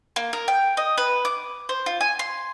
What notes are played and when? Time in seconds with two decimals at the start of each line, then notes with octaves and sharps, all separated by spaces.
0.16 A#3
0.33 A#4
0.48 G5
0.77 D#5
0.98 B4
1.25 D6
1.69 C5
1.86 F4
2.01 G#5
2.19 C6